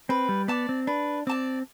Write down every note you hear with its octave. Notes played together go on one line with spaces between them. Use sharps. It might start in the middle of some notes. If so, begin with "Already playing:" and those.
C4 B4
G3
B3 D5 A5 D6
C4
D4 B4
C4 D5 A5 D6